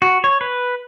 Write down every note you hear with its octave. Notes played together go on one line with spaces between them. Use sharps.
F#4
C#5
B4